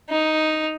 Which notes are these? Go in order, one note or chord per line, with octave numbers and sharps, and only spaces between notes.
D#4